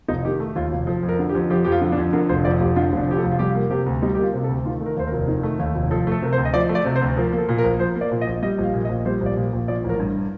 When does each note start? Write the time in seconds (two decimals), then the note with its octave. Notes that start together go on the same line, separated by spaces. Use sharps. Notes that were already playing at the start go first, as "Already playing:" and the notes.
0.08 F1 D#4
0.25 D#3 G4
0.40 A3
0.56 D#2 F4
0.72 F1
0.87 F3 A4
1.03 F2
1.09 A#4
1.19 D3
1.29 G4
1.35 F2
1.50 F3 G4
1.64 F2 G4
1.72 F4
1.81 D3
1.92 D4
1.98 F2
2.13 D3 A#4
2.29 F1 C5
2.45 F2 D5
2.60 F1 G4
2.76 D3 F4
2.92 F1 D4
3.07 F2 G4
3.18 A4
3.24 F1
3.31 F4
3.39 G3 G4
3.55 A#3
3.70 C3 G4
3.86 D2
4.02 G3 D#4
4.15 G4
4.18 A#3 F4
4.33 C3
4.44 A4
4.49 D2
4.65 D#3 F4
4.81 A3
4.86 A#4
4.96 D#2 C5
5.07 A#4
5.12 F1
5.28 D#3
5.43 A3
5.59 D#2
5.75 F1
5.91 F3 A4
6.07 A3 A4
6.22 C3 A#4
6.33 C5
6.38 D2
6.45 D#5
6.54 F3 D5
6.69 A3
6.75 D5
6.85 C3
6.96 C5
7.01 D2
7.17 F3 A#4
7.32 A#3
7.38 A4
7.49 A#2
7.58 A#4
7.64 A#1
7.79 F3 C5
7.96 A#3
8.01 D5
8.11 A#2
8.21 D#5
8.27 A#1
8.42 G3 D#5
8.58 A#1
8.63 F5
8.73 A#2
8.85 D#5
8.89 A#1
9.05 G3 C5
9.21 A#1
9.26 D5
9.37 A#2
9.53 A#1
9.68 F3 D5
9.84 A1
9.89 A#4
10.00 G2